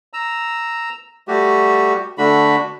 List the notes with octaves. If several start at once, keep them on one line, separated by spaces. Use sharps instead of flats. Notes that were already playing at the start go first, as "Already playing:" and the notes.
A#5 E6
G3 A3 F#4 G4
D3 A3 D4 F#4 B5